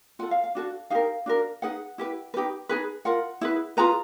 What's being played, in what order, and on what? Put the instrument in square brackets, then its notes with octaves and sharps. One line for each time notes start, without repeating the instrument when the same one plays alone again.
[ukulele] F4 A4 F#5
F5
F5
D4 F#4 A4
D#4 G4 A#4 F5
D4 F#4 A#4
D#4 G#4 B4 F#5
E4 G4 B4
D#4 G4 B4
D#4 G#4 B4
F4 A#4 F#5
E4 G#4 B4
F4 G#4 B4 A#5